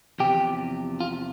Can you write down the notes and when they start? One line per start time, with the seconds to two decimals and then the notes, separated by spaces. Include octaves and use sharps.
0.19 E2 C3 F3 G4
1.00 F4